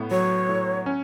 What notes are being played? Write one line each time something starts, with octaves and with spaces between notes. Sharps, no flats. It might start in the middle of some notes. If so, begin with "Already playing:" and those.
Already playing: A2 B3
F#3 C#5
A2
C#4